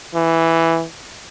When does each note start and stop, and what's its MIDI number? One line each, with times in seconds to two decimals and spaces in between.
0.14 0.84 52